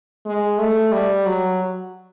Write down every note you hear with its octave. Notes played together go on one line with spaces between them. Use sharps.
G#3
A3
G3
F#3